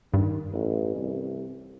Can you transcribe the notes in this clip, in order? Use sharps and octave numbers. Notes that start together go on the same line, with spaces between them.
G2 D#3
A1
C2